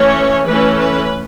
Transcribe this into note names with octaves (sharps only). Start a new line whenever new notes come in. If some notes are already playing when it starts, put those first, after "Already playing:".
Already playing: E3 A3 C#4 C#5
E3 A3 C#4 B4
B4